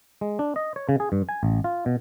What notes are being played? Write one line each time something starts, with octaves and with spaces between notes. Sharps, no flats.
G#3
D4
D#5
C#5
C#3
G#4
G2
G#5
A1
F4
B2